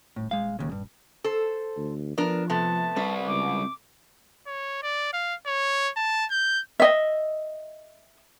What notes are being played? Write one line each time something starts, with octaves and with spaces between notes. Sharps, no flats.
D#1 A2
G#3 F5
D#2 C#3
G2
A4 C5
D2
F3 B3 D4 A#4
C3 A3 B3 A5
G3 C4 B4 E5
C#2 D6
C#5
D5
F5
C#5
A5
G6
D#5 E5